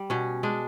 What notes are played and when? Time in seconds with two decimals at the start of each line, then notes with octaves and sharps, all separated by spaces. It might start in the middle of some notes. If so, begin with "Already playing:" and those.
Already playing: G3
0.10 B2 C#4
0.43 G#3 D4